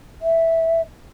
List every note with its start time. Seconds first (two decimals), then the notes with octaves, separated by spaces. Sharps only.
0.22 E5